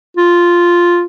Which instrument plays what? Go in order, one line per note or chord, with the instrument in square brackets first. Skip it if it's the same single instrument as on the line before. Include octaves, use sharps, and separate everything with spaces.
[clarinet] F4